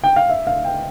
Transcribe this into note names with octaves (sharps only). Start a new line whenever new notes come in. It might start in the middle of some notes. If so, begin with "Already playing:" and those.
G5
F5
E5
F5
G5